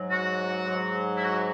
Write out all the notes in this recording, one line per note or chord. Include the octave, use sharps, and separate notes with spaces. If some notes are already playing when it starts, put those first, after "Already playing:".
Already playing: G#2 F#3
F#4
G#2 F#3
E4
F#4